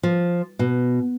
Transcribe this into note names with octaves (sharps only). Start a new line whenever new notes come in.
F3
B2